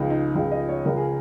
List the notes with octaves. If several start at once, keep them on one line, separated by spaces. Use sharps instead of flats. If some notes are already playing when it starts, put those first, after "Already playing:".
Already playing: C#2 C#3 F3 D#4
D#4
C#2 C#3 F3 D#4
D#5
C#5
C#2 C#3 F3 A#4
G#4